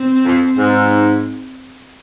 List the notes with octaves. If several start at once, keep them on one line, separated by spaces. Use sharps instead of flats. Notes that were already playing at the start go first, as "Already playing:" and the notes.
Already playing: C4
F2
G#2